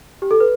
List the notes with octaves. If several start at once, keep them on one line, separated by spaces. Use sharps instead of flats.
G4
A4
B4